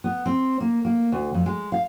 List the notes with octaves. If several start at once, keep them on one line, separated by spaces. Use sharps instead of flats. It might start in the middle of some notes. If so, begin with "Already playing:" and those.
B3
C4
A#3
A#3
D2
F2
G#3
F5